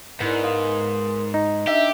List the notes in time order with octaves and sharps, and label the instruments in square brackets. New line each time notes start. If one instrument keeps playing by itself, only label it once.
[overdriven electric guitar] G#2 [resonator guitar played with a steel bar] B3 [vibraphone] E4 A#4 D5
[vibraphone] A#4 C6 D#6 [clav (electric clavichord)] F5
[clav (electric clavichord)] D#4
[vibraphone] D4 D#5 D6 [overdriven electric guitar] G4 [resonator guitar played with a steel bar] E5